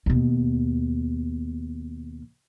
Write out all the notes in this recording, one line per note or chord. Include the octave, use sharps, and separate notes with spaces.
D#2 B2